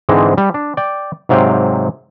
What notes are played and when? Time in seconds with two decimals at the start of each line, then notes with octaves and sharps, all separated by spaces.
0.09 G#2 D3 E3 G#3 C4
0.38 G3
0.54 D4
0.77 D5 G5
1.29 G#2 C3 F#3 F5 G5